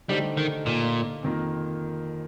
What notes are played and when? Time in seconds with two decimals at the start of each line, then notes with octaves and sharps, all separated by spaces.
0.09 D3 G3 A3 D#4 G4 C5
0.37 D#3
0.66 A#2
1.22 F2 C3 D#3 A#3 F4